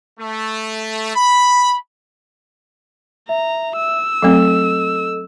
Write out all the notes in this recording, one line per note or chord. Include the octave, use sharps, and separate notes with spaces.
A3
B5
E5 A#5
E6
F#3 A3 C4 A4 D#5